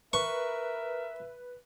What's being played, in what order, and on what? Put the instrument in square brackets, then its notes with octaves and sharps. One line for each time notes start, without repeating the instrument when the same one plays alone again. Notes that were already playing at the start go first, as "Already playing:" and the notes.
[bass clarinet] A#4 [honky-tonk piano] B4 [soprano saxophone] E5 [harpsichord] C#6